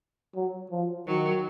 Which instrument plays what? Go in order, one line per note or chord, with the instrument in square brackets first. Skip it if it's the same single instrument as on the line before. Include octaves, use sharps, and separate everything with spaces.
[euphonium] F#3
F3
[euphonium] D#3 [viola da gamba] F#3